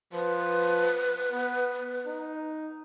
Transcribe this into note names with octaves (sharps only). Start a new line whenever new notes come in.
F3 B4
B3
D#4